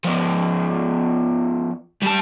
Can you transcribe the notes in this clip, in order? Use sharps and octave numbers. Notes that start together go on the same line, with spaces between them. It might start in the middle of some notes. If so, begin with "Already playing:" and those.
F3 B3
G3 A5